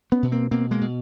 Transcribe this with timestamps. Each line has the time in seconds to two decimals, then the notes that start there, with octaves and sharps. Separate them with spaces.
0.12 B3 C#4
0.23 B2
0.32 A#3 C4
0.51 B2 A#3 C4
0.71 G#3 A#3
0.81 B2